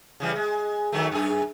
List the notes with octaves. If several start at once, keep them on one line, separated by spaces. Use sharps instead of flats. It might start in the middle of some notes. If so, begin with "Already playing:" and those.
C#3 E3 G3
G#3
D#3 F#3 A3
F#2 G#4